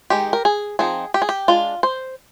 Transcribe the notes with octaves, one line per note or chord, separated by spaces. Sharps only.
D#3 G#3 D#4 G4
A#4
G#4
F3 C4 D#4 G#4
G4
G#4
G4
G#3 D4 F4
C5